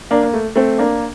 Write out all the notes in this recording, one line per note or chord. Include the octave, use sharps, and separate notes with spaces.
A#3 D4
A#3
A3
A3 C4
A#3 D4